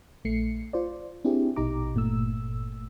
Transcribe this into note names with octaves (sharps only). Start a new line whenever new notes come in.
A#1 A3 C7 C#7
F4 C5 D5
C4 D4 E4 G4 G#4
A#1 B2 D#4 G4 A#5 D6
G1 A#2 A3 E6